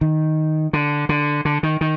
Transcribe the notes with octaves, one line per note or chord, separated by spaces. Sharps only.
D#3
D3
D3
D3
D#3
D#3